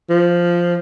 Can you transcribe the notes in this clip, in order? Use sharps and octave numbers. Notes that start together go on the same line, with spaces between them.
F3